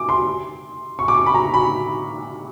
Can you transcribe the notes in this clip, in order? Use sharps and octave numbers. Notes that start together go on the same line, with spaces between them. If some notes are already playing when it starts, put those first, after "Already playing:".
Already playing: D6
C6
C#6
D6
C#6
B5
A#5
B5